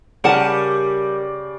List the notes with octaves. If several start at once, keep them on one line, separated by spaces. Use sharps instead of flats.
C#3 G3 A#4 D5 F#5 A5 C#7